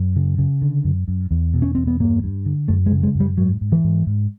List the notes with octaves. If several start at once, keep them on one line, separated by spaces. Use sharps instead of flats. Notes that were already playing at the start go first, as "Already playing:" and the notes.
Already playing: F#2
C#3
C#3
D3
F#2
F#2
E2
B2
C#4
E2 C4
B3
G2 A#3
G2
D3
F#2 A3
G#3
C#3
G#3
F#2
G3
G#2 F#3
G#2
E3
G#2
G#2